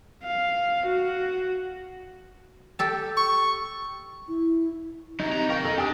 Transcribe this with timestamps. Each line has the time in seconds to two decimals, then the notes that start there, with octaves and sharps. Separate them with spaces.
0.23 F5
0.86 F#4
2.79 G4 A4 A5
3.17 C#6
4.28 E4
5.20 C3 F#3 D#4
5.32 C3 B3 A#5
5.49 A#4 D#5 F5 G5 C#6
5.64 F1 A4 F6
5.78 D4 G4 G#5 D#6